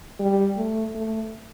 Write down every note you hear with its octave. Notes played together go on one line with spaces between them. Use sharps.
G3
A3
A3